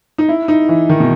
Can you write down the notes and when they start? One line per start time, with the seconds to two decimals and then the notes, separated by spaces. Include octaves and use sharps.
0.18 D#4
0.29 E4
0.48 D#4
0.69 E3
0.89 D#3
1.00 B2